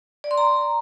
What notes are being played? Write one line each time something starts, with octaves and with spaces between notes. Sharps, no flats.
D5
C6
A#5